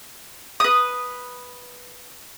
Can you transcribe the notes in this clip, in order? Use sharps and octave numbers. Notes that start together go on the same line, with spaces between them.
B4 D#6